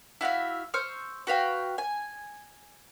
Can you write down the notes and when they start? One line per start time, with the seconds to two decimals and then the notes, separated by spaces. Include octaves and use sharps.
0.21 E4 F#4 E5 F5
0.74 C5 C#6 E6 F6
1.27 F#4 B4 F5 G5
1.78 G#5